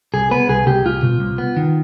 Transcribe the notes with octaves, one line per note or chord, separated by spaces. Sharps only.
C2 G#4
B3 B4
C2 G#4
C2 G4
C2 F4
B2
C2
B3
D#3